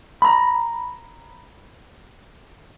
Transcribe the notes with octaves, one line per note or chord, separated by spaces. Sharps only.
A#5 B5